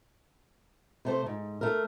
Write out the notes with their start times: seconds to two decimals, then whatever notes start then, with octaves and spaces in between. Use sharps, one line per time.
1.05 C3 A3 C5
1.26 G#2
1.61 A3 A#4